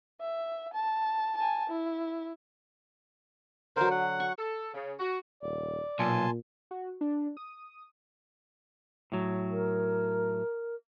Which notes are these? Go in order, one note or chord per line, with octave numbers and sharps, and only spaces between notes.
E5
A5
G#5 A5
E4
D3 F#3 A#4 C5
F#5
C#6
A4
C#3
F#4
D#1 D5
B1 A#2 G#5 A5 C6
F#4
D4
D#6
A2 F#3
A#4